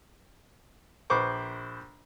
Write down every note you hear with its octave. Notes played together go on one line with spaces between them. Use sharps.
A#1 B4 C5 C#6 D6